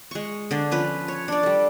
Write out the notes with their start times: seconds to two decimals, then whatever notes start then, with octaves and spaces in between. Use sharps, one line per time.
0.11 G#3 C#6
0.51 D3 D4
0.71 F3 C#4 B4
1.08 C#5
1.28 D4 D5
1.43 G3 A4